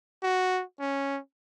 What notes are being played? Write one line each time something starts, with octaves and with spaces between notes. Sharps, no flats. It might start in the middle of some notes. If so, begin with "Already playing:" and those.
F#4
C#4